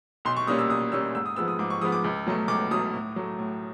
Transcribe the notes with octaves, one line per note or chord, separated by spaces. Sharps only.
B1 C6
C#6
A#2 G3 A#3 C#4 D#6
E6
B1 D#6
A#2 G3 A#3 C#4 E6
G#2 E6
D#6
F3 G#3 B3 E6
D#6
G#2 D6
C#6
F3 G#3 B3 D#6
D6
C#2
B2 F#3 A3
C#2 D6
B2 F#3 A3 D#6
A2
F#3 A3
A2